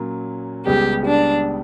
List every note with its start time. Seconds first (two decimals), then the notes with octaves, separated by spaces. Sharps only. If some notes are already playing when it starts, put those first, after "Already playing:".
Already playing: A#2 F#3 A#3 C#4
0.66 C#2 C#3 G3 B3 G4
1.06 D4